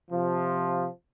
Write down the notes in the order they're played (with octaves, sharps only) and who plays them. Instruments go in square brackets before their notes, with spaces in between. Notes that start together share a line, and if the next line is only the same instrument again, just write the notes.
[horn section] C3 F3